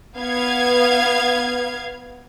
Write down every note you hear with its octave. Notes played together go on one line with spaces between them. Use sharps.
B3 F5 G#6